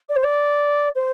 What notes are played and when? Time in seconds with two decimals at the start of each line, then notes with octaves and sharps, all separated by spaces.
0.09 D5
0.16 C5
0.23 D5
0.95 C5